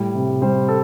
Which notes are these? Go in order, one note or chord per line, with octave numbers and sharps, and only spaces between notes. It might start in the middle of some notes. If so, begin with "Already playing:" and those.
Already playing: A2 G3
C3
G3 C5
A4